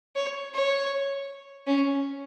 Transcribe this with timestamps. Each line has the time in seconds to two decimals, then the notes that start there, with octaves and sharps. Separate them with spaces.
0.15 C#5
0.54 C#5
1.67 C#4